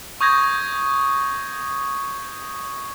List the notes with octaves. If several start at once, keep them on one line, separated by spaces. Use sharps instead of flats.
C#6 D#6 G6 G#6 A#6